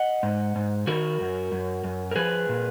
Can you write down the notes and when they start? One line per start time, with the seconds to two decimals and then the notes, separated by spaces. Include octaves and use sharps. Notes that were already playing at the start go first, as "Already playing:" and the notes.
Already playing: D#5 F#5
0.23 G#2
0.56 G#2
0.87 D#3 F#4 A#4
1.20 F#2
1.52 F#2
1.84 F#2
2.11 A#4
2.16 F3 G#4 B4
2.49 A#2